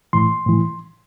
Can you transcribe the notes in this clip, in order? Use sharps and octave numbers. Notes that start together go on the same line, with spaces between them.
A2 E3 C6
A2 E3